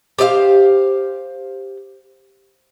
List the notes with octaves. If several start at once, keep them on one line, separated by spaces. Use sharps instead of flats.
G4 C5 D#5 F5